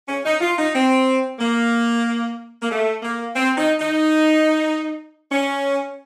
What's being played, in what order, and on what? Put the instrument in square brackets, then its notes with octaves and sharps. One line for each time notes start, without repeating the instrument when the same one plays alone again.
[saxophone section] C#4
D#4
F4
D#4
C4
A#3
A#3
A3
A#3
C4
D#4
D#4
C#4